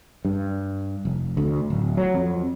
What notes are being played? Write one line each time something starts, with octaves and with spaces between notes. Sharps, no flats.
G2
F1
D2
D1
F#3
F2